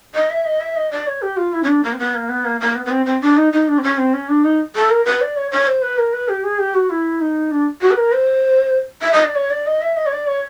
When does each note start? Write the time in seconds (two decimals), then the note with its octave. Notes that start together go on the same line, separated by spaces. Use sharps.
0.15 D#5
0.30 E5
0.45 D#5
0.61 E5
0.76 D#5
0.91 D5
1.07 C#5
1.22 G4
1.37 F4
1.53 E4
1.63 C#4
1.68 D4
1.83 A#3
1.93 C4
1.99 B3
2.14 A#3
2.29 B3
2.45 A#3
2.60 A#3
2.75 B3
2.85 B3
2.91 C4
3.06 C4
3.21 D4
3.37 D#4
3.52 D#4
3.68 D4
3.78 C4
3.83 C#4
3.98 C4
4.13 C#4
4.29 D4
4.44 D#4
4.75 A4
4.90 A#4
5.05 B4
5.21 D5
5.36 C#5
5.52 C#5
5.67 C5
5.82 B4
5.98 A#4
6.13 B4
6.28 G4
6.44 G#4
6.59 G4
6.74 F#4
6.90 E4
7.20 D#4
7.51 D4
7.82 F#4
7.91 B4
7.97 A#4
8.13 C5
9.02 E5
9.12 D#5
9.24 D5
9.35 C#5
9.50 D5
9.66 D#5
9.82 E5
9.96 D#5
10.06 C#5
10.12 D5
10.27 C#5